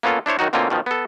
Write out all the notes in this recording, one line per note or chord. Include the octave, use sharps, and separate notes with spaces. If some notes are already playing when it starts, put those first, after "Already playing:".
A#3 B3 C#4 F4 A4
D4 E4 C5 C#5
D#3 F#3 D#4 F#4
B2 D3 A#3 C4 C#4 F4
B2 D#3 F3
B3 A4